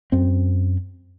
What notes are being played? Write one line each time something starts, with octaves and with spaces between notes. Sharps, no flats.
F#2 C4